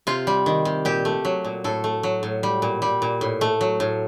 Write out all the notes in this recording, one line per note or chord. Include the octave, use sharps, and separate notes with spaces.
C3 F4
G3
D#3
C3
A#2 G4
A3
F#3
A#2
A2 A4
A3
F#3
A2
G3
A#2
G3
A#2
A2
A3
F#3
A2